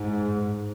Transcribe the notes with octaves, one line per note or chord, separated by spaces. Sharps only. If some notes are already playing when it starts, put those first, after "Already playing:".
Already playing: G#2